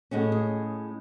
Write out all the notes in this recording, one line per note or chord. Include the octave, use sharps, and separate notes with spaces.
A2 G#3 C#4 F#4
G#4